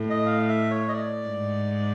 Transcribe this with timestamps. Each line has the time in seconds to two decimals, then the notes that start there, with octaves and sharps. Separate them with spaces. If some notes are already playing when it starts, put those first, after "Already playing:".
Already playing: A2
0.10 D#5
0.26 F5
0.49 E5
0.70 C#5
0.88 D#5
0.93 D5
1.26 G#2